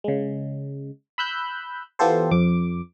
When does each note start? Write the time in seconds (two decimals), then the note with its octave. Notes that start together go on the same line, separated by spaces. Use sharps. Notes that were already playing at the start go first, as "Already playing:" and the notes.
0.04 C#3 G#3
1.18 B5 E6 F#6 G6
1.99 E3 B3 F4 G4 A4 C5
2.31 F2 D6